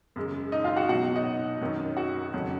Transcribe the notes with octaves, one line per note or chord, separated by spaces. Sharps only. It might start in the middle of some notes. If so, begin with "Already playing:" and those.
F#2 C#3 G#3
D#4 D#5
F4 F5
F#4 F#5
B2 F#3 F#4 F#5
D#4 D#5
F#2 D#3 F#3
F#4 F#5
F2 C#3 F#3